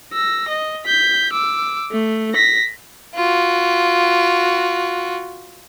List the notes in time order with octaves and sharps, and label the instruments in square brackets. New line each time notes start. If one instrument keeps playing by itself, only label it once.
[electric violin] E6 A#6
D#5
G6 B6
D6 E6
A3
A#6 B6
[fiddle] F4 F#4